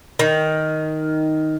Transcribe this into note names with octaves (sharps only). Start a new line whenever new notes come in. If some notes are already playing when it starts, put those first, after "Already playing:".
D#3